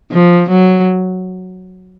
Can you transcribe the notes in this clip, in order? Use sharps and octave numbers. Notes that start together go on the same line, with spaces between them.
F3
F#3